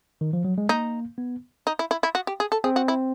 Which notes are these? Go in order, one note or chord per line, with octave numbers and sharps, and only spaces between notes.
D#3
F3
F#3
G#3
A#3 D#4
B3
D#4
E4
E4
E4
F#4
G4
G#4
A4
C4 G#4
F#4
E4